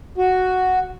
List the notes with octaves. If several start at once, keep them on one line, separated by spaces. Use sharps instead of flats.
F#4